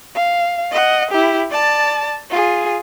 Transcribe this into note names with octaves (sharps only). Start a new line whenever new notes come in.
F5
D#5 F#5
E4 G4
D5 A5
F4 G#4